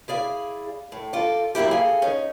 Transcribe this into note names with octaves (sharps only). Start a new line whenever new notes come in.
E4 G#4 D5 F5
A2
F4 A4 D5
F#2 E3 A#3 E4 G4
G#4 A4 F5
C#4 D#4